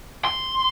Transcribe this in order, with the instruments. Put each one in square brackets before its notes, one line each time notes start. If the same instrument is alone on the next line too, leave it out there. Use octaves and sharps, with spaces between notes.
[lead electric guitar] C6